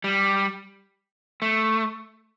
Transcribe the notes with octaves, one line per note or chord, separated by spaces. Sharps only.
G3
A3